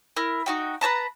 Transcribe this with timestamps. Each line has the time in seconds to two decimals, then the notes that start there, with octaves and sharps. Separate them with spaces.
0.16 E4 A#4
0.46 D#4 F#4 G5
0.81 B4 C#5 A5 A#5